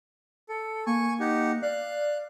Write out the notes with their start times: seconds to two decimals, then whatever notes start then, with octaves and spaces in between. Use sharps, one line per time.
0.49 A4 C#7
0.87 A#3 G#5 C#6
1.20 D#4 G4 F#5
1.62 D5 F5 F#6